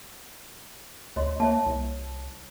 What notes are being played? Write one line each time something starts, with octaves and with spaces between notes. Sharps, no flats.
D2 C#5 D#5 C6
A#3 C#5 E5 A5
C2